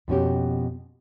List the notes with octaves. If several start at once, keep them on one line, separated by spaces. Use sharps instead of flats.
F2 B2 C#4 G4